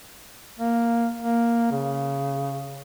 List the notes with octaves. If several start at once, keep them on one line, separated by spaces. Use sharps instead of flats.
A#3
A#3
C#3